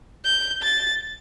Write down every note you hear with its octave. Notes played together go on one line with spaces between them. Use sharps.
G6
A6